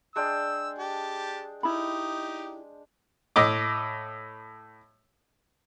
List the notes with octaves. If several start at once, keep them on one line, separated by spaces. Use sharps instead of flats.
G#3 D4 G5 E6
G4 A5
D#4 E4 G4 B5
A2 D#5 D6